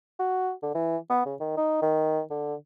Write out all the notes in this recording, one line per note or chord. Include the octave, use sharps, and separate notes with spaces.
F#4
D3
E3
B3
C#3
D#3
D#4
D#3
D3